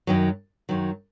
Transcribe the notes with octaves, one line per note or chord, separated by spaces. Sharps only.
F#2 D#3 F#3
F#2 D#3 F#3